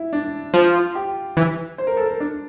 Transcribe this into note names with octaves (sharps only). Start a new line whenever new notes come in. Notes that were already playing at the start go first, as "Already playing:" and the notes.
Already playing: E4
D4
F3 F4
G4
E3
C5
A#4
A4
A#4
D4